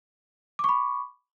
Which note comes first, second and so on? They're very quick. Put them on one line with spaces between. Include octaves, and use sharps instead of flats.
D6 C#6 B5